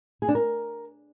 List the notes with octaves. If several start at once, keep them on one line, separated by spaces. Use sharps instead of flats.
G#4
D4
A#4